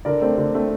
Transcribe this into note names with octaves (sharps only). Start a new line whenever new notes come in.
D3 A#4 D5
A3 C4
D3
A3 C4